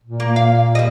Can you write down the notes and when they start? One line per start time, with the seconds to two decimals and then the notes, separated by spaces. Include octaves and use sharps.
0.04 A#2
0.20 A#3
0.36 F5
0.75 G3 D#5